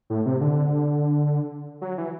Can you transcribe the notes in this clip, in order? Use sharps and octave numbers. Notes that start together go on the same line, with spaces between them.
A2
C3
D3
F#3
E3